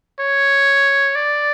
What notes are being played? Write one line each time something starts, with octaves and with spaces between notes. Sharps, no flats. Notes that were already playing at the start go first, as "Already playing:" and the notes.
C#5
D5